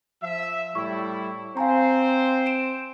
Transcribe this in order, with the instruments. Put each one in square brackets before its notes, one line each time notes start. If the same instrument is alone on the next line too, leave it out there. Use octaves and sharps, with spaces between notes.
[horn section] F3 E5
[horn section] A2 G3 E4 [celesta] C#6
[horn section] C4 C5 [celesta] F5 G#5 A#5
[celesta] D7 E7